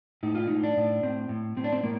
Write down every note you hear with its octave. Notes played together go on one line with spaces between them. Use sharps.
A2 D#4
F4
A2 D#4
D4
A2
A2 C4
A2
A2 C4
D4
C4
A2 A#3